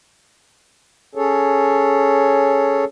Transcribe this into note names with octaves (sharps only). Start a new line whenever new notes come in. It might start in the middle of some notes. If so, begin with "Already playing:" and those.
C#4 G#4 A4 C#5